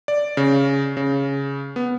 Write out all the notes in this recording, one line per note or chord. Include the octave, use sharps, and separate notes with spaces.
D5
C#3
C#3
B3